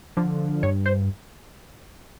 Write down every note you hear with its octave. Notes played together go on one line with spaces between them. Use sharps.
D3 F3
G2 C#5
C5